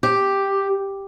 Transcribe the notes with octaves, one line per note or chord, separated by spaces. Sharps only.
G4